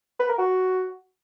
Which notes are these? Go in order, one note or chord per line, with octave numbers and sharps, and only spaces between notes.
B4
A#4
F#4